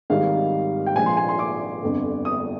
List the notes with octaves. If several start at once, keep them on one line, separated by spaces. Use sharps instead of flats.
G#1 G#2 D#3 G3 F5
G5
A#1 G#2 F3 G#5
C6
G#5
C6
D6
G1 F2 D3
D#6